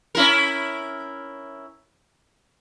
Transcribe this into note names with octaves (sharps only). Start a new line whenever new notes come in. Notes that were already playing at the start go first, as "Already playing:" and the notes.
C#4 E4 A#4